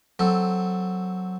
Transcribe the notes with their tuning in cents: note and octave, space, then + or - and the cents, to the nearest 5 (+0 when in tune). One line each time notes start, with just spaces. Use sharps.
F#3 +0 C4 +0 A4 +0